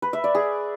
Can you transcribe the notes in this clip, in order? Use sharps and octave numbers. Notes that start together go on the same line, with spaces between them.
B4
E5
D5
G#4